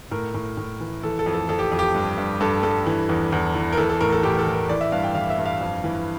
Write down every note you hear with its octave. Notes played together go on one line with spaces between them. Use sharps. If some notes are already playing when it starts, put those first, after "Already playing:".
A2 A#4
A2
A2
E3
E3 A4
A4
F2
A4
F2 A4
G4
F2
G4
G2
G2
G2 A4
G2 A4
E3
E2
E2
E3
A#4
E3 A4
A4
A2 A#4
A4
A2 G4
A4
E3
A#4
E3 D5
E5
G2 F5
G5
E3 F5
E5
G2
F5
F2
E3